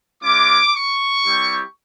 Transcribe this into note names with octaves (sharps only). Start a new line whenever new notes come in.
G#3 C#4 F4 D6
C#6
G3 C4 E4 G4